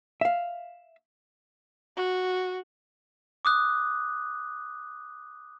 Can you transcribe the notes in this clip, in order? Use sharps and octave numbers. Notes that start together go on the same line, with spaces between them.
E5 F5
F#4
D6 D#6 F#6